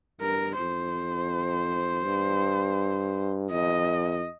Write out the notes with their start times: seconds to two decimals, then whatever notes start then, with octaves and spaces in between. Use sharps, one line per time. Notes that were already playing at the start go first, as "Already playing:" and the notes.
0.21 G2 A#4
0.57 F2 C5
2.05 G2
3.51 F2 D#5